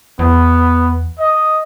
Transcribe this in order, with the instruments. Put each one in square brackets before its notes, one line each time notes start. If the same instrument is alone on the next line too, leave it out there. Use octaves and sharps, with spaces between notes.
[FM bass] E2 [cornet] B3
[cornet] D#5